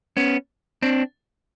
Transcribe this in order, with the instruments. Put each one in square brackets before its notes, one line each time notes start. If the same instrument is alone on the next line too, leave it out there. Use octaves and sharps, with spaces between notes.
[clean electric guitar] B3 C#4
C4 D4